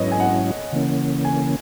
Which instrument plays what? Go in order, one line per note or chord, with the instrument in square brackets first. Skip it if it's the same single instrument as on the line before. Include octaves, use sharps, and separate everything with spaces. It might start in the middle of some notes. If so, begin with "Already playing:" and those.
Already playing: [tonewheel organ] G#2 F#3 C#4 E4 [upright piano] B4 C#5 D#5
[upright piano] G#5
F#5
[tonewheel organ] C#3 E3 A#3 C#4
[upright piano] G#5